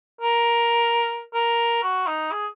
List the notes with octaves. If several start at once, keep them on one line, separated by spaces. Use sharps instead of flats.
A#4
A#4
F#4
D#4
G#4